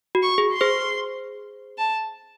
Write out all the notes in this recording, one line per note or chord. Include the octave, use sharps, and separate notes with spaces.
F#4
C#6
G#4
C6
G#4 C5
A5